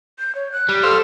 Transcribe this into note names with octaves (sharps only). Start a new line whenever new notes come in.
G6
C#5
F#6
G3
A4 C5 F5 E6